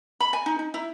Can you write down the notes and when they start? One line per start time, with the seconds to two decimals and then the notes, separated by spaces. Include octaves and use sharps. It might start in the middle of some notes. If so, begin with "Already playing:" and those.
0.20 B5
0.33 G#5
0.46 D#4
0.59 D#4
0.74 E4